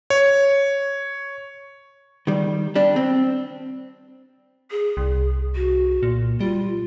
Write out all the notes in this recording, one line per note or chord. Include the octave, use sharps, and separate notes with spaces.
C#5
D#3 G3
G3 D4
C4
G#4
C2
F#4
A#2
G3 F4